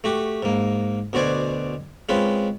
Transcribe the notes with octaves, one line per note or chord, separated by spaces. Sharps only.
A3 F#4 G4
G#2 A#3
D2 B2 F#4 C5 D5 G#5
G#3 C4 C#4 F4 B4